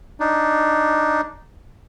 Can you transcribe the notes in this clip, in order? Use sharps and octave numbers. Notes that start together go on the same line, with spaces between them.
D4 D#4